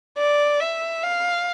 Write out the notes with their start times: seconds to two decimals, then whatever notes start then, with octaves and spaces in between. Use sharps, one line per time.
0.18 D5
0.60 E5
1.03 F5